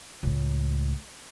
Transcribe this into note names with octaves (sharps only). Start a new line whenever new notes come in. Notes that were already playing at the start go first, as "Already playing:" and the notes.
C#2 A2